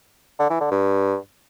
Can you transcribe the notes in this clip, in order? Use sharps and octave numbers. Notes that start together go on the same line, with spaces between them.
D3
E3
D3
G2